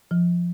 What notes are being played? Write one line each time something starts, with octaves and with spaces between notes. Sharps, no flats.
F3